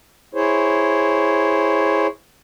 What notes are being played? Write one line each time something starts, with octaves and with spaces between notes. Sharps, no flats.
E4 G#4 C5 C#5